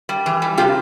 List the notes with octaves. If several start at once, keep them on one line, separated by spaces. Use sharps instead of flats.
G3
E3
G3
C3 F4 G4